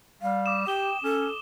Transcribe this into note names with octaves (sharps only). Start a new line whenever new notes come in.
G3 F5
D6 D#6 E7
G4 G5 D#6 G7
C#4 A4